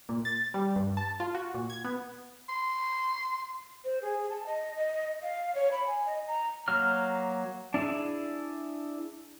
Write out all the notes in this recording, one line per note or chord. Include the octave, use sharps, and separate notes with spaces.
A#2
A6
G3
G2
A5
F4
F#4
A#2
G#6
B3
C6
C5
G#4
A5
D#5
D#5
F5
C#5
B5
G#5
D#5
A#5
F#3 A#3 F6
D4 E4 G#4